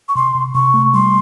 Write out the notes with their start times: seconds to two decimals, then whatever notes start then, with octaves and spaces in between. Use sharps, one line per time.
0.08 C#6
0.15 C3 C6
0.35 C3
0.55 C3 C#6
0.74 A3
0.94 G3 C6